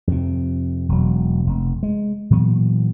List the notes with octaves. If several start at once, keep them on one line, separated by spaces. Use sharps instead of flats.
F2 C3
E1 F#3
F1
G#3
A#2 E3 F#3 B3